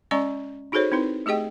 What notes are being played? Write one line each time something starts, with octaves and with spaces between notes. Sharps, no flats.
G#3 C#4 D5 A#5 C#6
D#4 F#4 G#4 A4 C5 C#5
C4 D#4 E4 B4
A3 G4 G#4 D#5 G5